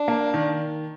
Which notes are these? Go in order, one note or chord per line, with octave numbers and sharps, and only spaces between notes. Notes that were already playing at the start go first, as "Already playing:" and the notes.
Already playing: D4
A#3
D#3